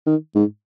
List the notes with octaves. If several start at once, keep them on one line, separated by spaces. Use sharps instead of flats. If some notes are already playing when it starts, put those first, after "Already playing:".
D#3
G#2